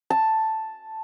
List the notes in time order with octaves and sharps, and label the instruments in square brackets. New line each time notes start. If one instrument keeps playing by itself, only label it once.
[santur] A5